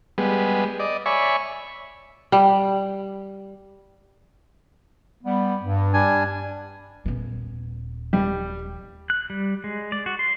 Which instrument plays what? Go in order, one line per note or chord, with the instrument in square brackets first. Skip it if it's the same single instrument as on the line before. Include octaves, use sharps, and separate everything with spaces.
[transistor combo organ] G3 G#3 B3
D5 D#5
C#5 D5 E5 G#5 B5 C#6
[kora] G3
[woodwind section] G3 B3
G2
[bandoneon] G3 D4 G#5
[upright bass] D#1 B3
[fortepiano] G3
[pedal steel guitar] F#6
G3
G#3
D5
F#4
C6